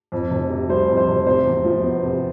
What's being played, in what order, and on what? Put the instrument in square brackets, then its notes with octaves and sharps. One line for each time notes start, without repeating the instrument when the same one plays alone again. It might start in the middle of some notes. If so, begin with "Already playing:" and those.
[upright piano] F2
F1
C3
[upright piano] G3 [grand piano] C5
[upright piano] F2
[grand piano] C5
[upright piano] F1
[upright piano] C3 [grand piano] C5
[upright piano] E2
F3
B3
C3